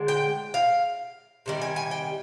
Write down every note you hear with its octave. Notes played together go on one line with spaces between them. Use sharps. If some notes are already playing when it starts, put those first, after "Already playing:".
Already playing: D3 G#3
G5
F5
C3 D#3 G3
G#5
G#5
G5